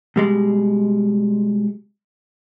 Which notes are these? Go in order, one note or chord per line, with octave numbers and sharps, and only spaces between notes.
B2 G3 G#3